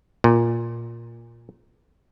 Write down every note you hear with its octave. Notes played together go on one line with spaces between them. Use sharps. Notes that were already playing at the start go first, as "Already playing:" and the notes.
A#2